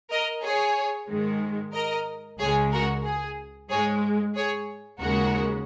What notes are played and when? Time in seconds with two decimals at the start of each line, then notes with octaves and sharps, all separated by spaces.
0.11 A#4 D#5
0.43 G#4 C#5
1.09 G#2 D#3 G#3
1.74 A#4 D#5
2.39 C#2 C#3 G#3 G#4 C#5
2.72 F#4 A#4
3.05 G#4
3.70 G#2 G#3 G#4 C#5
4.36 G#4 C#5
5.00 D#2 C#3 G#3 F#4 A#4